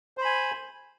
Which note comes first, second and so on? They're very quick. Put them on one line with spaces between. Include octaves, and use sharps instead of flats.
C5 B5 G#5